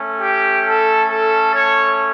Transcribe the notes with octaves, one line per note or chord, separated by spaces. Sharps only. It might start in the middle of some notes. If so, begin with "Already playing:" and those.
Already playing: A3 C#4
G4
A4
A4
C#5